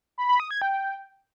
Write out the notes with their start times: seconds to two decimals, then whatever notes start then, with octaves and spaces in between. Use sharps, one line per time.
0.18 B5
0.29 B5
0.40 D#6
0.51 G#6
0.62 G5